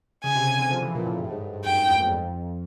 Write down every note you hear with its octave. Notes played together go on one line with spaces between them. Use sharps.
C#3 G#5
C3
C3
D3
F3
E3
A#2
A2
G2
A2
G#2
G2
G2
F#2 G5
E2
F2
F2